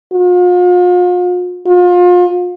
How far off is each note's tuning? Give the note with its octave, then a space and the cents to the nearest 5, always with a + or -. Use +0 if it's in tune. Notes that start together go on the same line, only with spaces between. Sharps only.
F4 +40
F4 +35